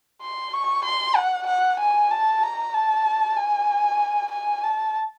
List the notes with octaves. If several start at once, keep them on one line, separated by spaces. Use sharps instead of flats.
C6
C#6
C6
F#5
F#5
G#5
A5
A#5
A5
G#5
G#5
A5